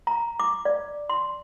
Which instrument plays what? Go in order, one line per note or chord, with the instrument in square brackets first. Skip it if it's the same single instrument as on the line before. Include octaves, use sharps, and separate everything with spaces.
[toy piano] A#5
D6
D5
C6